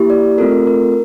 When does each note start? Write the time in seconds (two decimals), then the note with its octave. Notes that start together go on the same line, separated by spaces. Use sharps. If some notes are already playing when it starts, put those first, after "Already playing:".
Already playing: A#3 E4 G4
0.10 D5
0.38 A3 C4 F4 A4 A#4
0.67 A#4